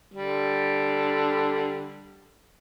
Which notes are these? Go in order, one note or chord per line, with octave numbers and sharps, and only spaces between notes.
D3 G3